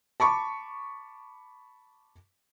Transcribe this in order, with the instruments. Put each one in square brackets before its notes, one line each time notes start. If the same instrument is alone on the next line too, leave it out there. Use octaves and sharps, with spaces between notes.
[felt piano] A5 B5 C#6 D6